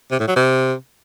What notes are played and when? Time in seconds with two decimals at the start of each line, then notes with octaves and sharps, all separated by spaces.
0.11 C3
0.20 A2
0.28 F#3
0.36 C3